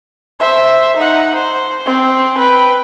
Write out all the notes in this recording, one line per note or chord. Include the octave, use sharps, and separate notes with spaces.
C5 E5
D#4 F#5
C5
C4
B4 G5